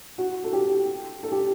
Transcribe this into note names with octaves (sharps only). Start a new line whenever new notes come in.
F#4
A4
G4
A4
G4